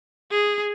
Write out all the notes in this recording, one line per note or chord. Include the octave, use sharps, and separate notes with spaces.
G#4